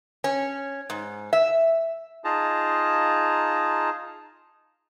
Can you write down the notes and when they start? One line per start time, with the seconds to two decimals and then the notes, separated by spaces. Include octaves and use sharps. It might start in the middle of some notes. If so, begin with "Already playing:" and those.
0.24 C#4
0.90 G#2
1.33 E5
2.25 D#4 F4 G#4 A5 A#5